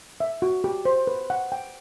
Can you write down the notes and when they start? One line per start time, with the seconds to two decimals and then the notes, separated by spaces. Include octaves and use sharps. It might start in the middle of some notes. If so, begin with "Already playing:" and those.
0.20 E5
0.42 F#4
0.64 G4
0.85 C5
1.07 B4
1.30 F#5
1.52 G5